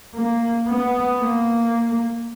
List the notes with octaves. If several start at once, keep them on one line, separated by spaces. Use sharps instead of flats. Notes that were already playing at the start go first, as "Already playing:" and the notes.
A#3
B3
A#3